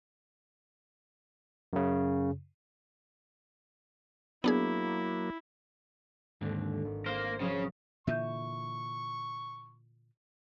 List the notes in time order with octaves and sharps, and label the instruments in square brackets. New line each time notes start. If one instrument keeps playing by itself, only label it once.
[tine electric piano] F#2 C#3
[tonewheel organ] F#3 A#3 [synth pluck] B3 D4 G#4 [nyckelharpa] E4
[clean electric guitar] D#2 G#2 D3 [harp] A3 C4 D4
[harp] G#1
[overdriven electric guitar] A#3 A#4 [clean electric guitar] C5
[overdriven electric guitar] C#3 C#4 [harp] F3 F#3
[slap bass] A#2 D3 E3 [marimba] E5 G6 [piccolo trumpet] C#6